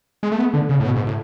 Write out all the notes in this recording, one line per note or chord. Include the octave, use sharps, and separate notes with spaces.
G#3
A3
B3
D3
C#3
A2
B2
G#2
A2